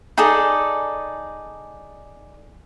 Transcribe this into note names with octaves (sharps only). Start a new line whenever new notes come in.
D#4 G#4 A4 D5